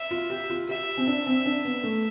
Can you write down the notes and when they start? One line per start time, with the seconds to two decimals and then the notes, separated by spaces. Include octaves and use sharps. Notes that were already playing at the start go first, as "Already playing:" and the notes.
Already playing: E5
0.11 F4
0.30 G4
0.50 F4
0.69 G4 E5
0.97 C4
1.07 D4
1.27 C4
1.46 D4
1.65 B3
1.84 A3